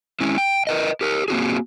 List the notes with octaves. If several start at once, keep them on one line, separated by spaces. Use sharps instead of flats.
G#3 C#4 E4
G5
A#4 B4 D#5
G4 A#4
A#3 C4 F#4 G#4